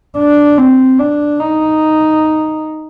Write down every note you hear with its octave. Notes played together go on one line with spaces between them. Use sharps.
D4
C4
D4
D#4